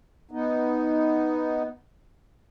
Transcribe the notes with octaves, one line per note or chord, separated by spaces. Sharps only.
B3 D#4